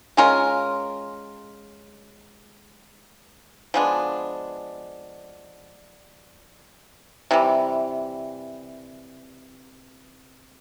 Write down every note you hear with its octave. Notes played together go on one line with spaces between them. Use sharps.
G#3 C#4 F4 A#4
F3 G#3 B3 D4
C3 E3 G3